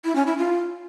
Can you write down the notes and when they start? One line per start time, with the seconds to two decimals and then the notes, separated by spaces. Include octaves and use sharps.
0.04 E4
0.15 C#4
0.26 E4
0.37 F4